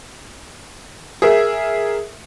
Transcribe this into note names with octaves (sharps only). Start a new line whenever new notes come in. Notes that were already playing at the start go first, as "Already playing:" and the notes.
G#4 A#4 E5